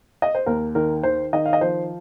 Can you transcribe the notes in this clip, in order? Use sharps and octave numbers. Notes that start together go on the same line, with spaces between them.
D#5
C5
D#2 A#4
D#3 A#4
D#3 C5
D#3 D#5
F5
D#5
F3 C5